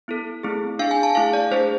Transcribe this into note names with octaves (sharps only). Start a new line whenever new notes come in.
B3 E4 A4
A3 C4 E4 G#4
D4 G#4 F5
G#5
A5
A3 E4 G#4 F5
D5
A3 D4 G#4 C5